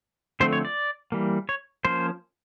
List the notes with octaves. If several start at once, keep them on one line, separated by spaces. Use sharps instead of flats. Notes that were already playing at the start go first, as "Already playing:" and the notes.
D3 F3 A3 C4 C5
C#5
D5
E3 G3 A#3
C#5
F3 A#3 C#4 C5